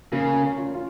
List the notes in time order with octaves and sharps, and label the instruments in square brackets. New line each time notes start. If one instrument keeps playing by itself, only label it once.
[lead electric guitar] C#3 [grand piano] A#3 C#4
[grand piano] A#3 C#4
C#4 F4
C#4 F4